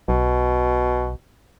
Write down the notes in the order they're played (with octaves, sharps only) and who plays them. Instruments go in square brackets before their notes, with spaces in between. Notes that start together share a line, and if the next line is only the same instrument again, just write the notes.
[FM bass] B1 [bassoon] B2